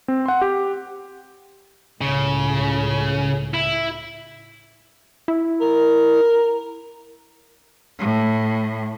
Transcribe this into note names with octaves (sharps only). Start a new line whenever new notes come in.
C4
F#5 C6
G4
C#2 A2 C#3
E4
E4
A#4
A2